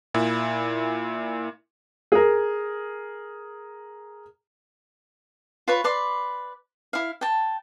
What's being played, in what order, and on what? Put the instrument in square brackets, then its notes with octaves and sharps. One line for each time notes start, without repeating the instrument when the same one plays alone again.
[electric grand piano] A#2 E4
[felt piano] G#4 A#4
[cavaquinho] F4 B4 C#5
B4 D5 C6
E4 F5
G5 A5